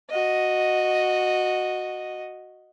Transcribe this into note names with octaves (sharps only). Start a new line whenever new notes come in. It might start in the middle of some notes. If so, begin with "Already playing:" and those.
F#4 D#5